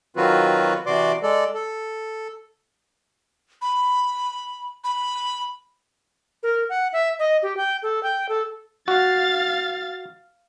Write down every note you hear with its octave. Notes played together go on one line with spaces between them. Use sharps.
D#3 F#3 C4 F4 F#4 B4
C3 E3 F#4 D5 C6 D6
G#3 A4 D5
A4
B5
B5
A#4
F#5
E5
D#5
G4
G5
A4
G5
A4
F#4 F5 A6